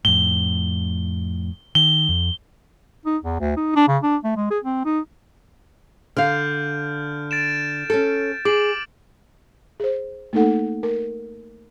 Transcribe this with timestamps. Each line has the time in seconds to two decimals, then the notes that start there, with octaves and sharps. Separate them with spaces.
0.05 F2 A2 G7
1.75 D#3 G7
2.09 F2
3.06 D#4
3.23 E2
3.40 D2
3.57 D#4
3.76 D4
3.88 C#3
4.03 D4
4.24 A3
4.36 G#3
4.51 G#4
4.63 C4
4.85 D#4
6.17 D3 F5 F6 G6
7.31 A6 D7 E7
7.90 C#4 A4
8.45 G#4 D6 D7 F#7
9.80 G#4 C5
10.33 A3 A#3 D#4 A4 F#5
10.83 A#4